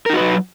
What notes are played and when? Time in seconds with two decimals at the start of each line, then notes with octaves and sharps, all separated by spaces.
0.06 A#4
0.10 D#4
0.13 F#4
0.17 B4
0.20 F#3